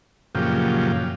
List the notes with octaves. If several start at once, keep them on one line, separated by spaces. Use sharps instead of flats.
F#2 A#2 C#3 F3 G4